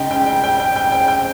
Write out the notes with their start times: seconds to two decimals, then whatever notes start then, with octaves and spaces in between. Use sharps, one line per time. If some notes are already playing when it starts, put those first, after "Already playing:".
Already playing: C#3 G#3 D#4 G5
0.11 G5
0.26 G5
0.44 G5
0.60 G5
0.76 G5
0.92 G5
1.08 G5